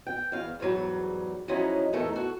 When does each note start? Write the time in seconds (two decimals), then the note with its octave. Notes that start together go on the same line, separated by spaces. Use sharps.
0.07 G5
0.32 E2 F5
0.60 E2 G#2 F#3 G3
1.48 F3 F#3 G#3 C#4 D#4 E4
1.93 E2 A3 D#4 A4 A#4
2.13 F#4 A4